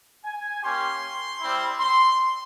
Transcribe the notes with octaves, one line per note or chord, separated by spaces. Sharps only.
G#5
A#3 C#4 G4 C6
G3 C4 E4
C6